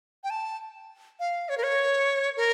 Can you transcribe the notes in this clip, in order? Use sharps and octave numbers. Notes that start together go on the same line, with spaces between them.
G5
A5
F5
C#5
A#4
C#5
A#4